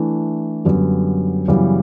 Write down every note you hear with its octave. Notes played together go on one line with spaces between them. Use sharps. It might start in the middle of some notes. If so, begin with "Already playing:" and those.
Already playing: E3 A3 D4
F#2 D3 G3 B3
F#2 C#3 E3 G3 B3